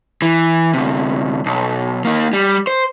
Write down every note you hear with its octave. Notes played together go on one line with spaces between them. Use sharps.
E3
D2 C3
B1
A#3 D#4
G3
C5